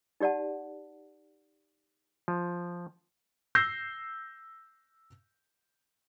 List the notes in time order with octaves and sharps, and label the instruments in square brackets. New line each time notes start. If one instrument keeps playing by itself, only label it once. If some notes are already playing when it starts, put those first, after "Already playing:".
[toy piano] D#4 G4 D5 F#5 A5
[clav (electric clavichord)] F3
[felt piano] E6 G6 A#6 C7